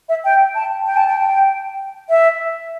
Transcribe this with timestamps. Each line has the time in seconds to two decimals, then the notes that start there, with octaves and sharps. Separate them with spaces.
0.09 E5
0.25 G5
0.55 A5
0.86 G5
0.97 A5
1.08 G5
2.09 E5